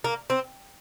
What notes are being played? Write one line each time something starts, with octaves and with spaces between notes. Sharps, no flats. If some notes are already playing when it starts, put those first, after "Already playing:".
A#3
C4